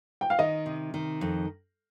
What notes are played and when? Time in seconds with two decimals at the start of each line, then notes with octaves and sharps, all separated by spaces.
0.21 G5
0.30 F5
0.39 D#3 D#5
0.66 C3
0.94 D#3
1.21 F2